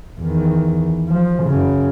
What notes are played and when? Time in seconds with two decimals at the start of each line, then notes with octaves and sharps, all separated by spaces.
0.19 E2 D#3
1.08 F3
1.44 F#2 C#3